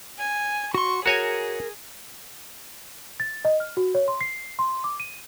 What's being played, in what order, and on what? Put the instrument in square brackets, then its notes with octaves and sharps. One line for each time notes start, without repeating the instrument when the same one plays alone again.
[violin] G#5
[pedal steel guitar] F#4 C6 [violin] C#6
[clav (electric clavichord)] F#4 C#5 G#5 [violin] G#4 [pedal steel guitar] A#4
[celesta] A6
D#5
F6
F#4
C#5
C6
C7
C6
D6
D#7